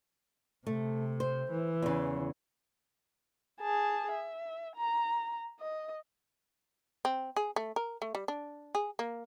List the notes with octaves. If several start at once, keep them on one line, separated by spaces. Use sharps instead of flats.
C3 A3
C5
E3
E2 C#3
G#4 A5
E5
A#5
D#5
C4
G#4
A3
A#4
A3
G3
D4
G#4
A#3